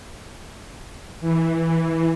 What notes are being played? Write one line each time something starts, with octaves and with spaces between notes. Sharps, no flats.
E3